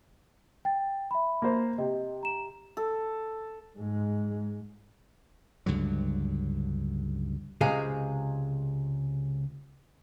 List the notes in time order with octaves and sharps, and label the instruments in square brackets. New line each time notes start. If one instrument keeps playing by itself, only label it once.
[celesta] G5 A6
E5 B5
[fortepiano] A#3 C5
[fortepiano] C3 [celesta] D#5
[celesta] A#5 E7
[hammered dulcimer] A4
[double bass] G#2 G#3
[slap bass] C#2 G2 D3 F#3
[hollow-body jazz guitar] C#2 C3 G#3 G#4 F5